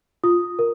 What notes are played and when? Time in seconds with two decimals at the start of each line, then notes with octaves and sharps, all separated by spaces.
0.24 F4 D#6
0.59 A#4